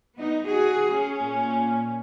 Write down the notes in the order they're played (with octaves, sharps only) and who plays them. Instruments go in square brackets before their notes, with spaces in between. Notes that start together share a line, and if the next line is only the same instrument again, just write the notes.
[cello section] B3 D#4
[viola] F#4 [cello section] G#4
[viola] C#4
[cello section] A#2